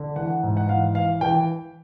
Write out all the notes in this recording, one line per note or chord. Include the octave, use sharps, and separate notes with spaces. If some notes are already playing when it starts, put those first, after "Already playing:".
Already playing: D3
E3 F#5
G#2
F#5
E3 F5
E3 F5
E3 G5